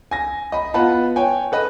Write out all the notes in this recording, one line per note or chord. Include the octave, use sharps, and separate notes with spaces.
G#5 A#6
D#5 B5
B3 F4 B4 F#5 A5 B5
C#5 G5 G#5
A4 B4 D#5